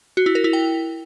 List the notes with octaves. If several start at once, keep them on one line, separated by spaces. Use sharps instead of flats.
F#4
E4
A#4
E4
G5